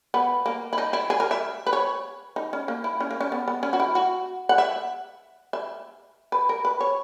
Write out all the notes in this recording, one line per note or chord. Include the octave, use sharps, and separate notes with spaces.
B3
A#3
E4
D#4
E4
G#4
A#4
E5
B4
C#5
D#4
C#4
A#3
E4
C#4
A#3
C#4
B3
B3
C#4
F#4
E4
F#4
F#5
E5
E5
B4
A#4
B4
C#5